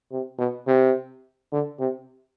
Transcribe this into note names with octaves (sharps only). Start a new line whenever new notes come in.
C3
B2
C3
D3
C3